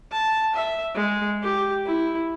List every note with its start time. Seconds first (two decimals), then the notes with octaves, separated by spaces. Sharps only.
0.12 A5
0.55 E5
0.95 G#3
1.43 G4
1.86 E4